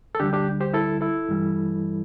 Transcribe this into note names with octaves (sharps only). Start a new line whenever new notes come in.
A4
D2 D3 G3 D4 G4
D4 G4
G4 C5
E4 A4
E4 A4
G2 E3 G3